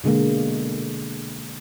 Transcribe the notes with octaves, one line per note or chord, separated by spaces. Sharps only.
B2 D3 G#3 A#3